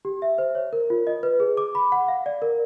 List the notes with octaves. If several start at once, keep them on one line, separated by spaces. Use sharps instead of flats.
G4
E5
C5
C#5
A#4
F4
D#5
B4
G#4
D6
B5
F#5
F5
D5
A#4